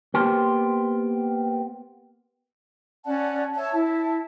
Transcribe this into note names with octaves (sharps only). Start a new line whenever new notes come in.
A#3 B3 G4 C5
C#4 D5 F#5 A5
C#5 E5 A5
E4 A5